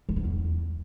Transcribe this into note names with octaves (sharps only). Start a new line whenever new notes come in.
D#3
D3
E2